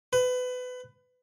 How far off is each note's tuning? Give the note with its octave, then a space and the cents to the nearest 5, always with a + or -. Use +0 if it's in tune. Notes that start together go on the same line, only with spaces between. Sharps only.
B4 +25